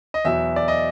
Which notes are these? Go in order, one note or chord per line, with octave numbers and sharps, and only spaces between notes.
D#5
E2 B2 F#3 E5
D5
D#5